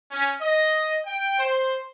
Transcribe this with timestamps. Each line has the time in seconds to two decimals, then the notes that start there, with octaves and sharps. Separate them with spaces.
0.10 C#4
0.41 D#5
1.05 G5
1.38 C5